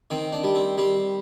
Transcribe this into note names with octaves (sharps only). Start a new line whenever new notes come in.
D#3 C4
D4
G3
C4
G3 C4